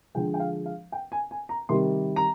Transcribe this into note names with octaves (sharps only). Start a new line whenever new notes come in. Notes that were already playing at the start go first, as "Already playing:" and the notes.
D3 F3 G#3 G5
G5
F5
F5
G5
G#5
G#5
A#5
C3 D#3 G3 C6
A#5